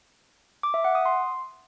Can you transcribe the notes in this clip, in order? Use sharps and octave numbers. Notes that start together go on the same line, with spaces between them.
D6
E5
F#5
D#6
C6